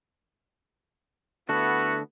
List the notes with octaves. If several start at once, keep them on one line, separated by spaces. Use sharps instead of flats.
D3 A3 B3 E4 F#4 A4